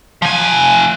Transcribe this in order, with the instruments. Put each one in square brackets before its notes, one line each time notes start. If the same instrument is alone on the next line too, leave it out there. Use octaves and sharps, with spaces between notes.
[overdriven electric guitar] F3 G#5